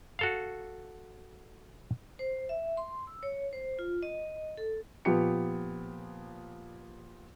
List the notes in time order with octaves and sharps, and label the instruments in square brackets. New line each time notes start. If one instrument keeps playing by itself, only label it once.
[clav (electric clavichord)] F#4 A4 F5
[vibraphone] C5
E5
C6
E6
C#5
C5
F4
D#5
A4
[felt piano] A#2 F3 B3 G4 C#7